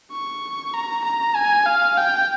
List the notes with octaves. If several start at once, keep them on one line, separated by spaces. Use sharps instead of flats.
C#6
A#5
A#5
G#5
F5
G5